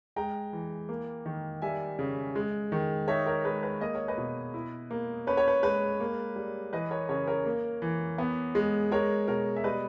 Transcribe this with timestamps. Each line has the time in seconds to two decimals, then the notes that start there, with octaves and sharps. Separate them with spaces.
0.16 G#3 G5 A#5
0.53 E3
0.89 A#3
1.26 D#3
1.62 G3 E5 G#5
1.99 C#3
2.35 G#3
2.72 D#3
3.08 D#4 C#5 E5
3.26 A#4 C#5
3.44 G#3 B4
3.63 B4
3.81 A#3 D#5
3.95 C#5
4.08 B4 D#5
4.18 B2
4.54 E4
4.91 A#3
5.27 C#4 B4
5.37 C#5
5.48 B4
5.63 G#3 B4
6.00 A#3
6.36 G3
6.73 E3 B4 D#5
6.91 A#4 C#5
7.09 C#3 A#4 C#5
7.27 A#4 C#5
7.46 A#3
7.82 E3
8.18 B3
8.55 G#3
8.91 G#3 A#4 C#5
9.28 B2 A#4 C#5
9.56 E5
9.64 G3 B4 D#5